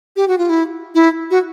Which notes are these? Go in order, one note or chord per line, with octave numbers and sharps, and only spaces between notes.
G4
F#4
F4
E4
E4
F#4